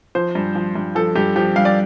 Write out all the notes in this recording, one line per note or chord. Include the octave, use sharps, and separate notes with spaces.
F3 C5
G2
F3
G2
F3 A4
G2 G4
F3 G4
G2 F5
D5